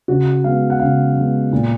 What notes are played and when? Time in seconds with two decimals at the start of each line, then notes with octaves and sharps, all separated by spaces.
0.08 C#3 F#4
0.44 G#3 B3 F5
0.70 F#5
0.80 C#3 F5
1.17 G#3 B3
1.52 A#2